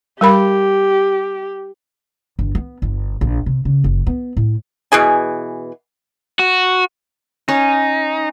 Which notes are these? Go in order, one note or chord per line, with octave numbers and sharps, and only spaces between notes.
G3 G4 A#4 B5
G1
B3
G1
A#1
C3
C#3
F#1
B3
A2
B2 E3 G#4 G#5
F#4
C#4 D#4